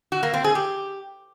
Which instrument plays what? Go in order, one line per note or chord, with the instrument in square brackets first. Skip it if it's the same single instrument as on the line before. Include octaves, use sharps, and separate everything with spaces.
[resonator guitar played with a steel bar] F#4
A#3
C4
G#4
G4